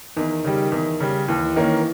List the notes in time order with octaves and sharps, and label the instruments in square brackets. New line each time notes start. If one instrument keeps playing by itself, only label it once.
[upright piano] E2 [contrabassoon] D#3
[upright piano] C#3 G3
E2
C#3 G3
[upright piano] D#2 [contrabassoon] E3
[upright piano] D#3 A#3 C#4